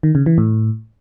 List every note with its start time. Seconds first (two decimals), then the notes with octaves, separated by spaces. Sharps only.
0.03 D#3
0.15 C#3
0.26 E3
0.38 A2